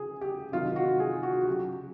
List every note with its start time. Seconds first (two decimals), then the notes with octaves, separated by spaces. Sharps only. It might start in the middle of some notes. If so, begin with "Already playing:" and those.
Already playing: C#3 G#4
0.21 G4
0.52 C3 D#3 F#3 F4
0.76 F#4
1.00 G#4
1.23 F#4
1.41 F#4
1.47 C#3 F#3 G4